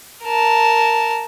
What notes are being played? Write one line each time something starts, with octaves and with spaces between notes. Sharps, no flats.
A#4 A5